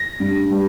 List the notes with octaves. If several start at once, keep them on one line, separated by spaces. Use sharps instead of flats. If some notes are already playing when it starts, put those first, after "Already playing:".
Already playing: A#6
G2
G3